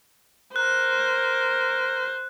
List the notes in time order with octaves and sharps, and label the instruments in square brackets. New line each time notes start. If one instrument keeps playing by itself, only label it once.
[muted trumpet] A#4 [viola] C5 [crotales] F#6